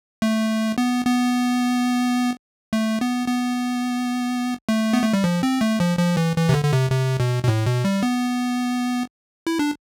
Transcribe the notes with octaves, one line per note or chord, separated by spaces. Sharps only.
A3
B3
B3
A3
B3
B3
A3
B3
A3
G3
F3
C4
A3
F3
F3
E3
E3
C3
D3
D3
C3
C3
B2
B2
A2
B2
G3
B3
E4
D4